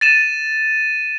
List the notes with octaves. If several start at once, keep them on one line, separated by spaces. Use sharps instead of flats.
A6 D#7 E7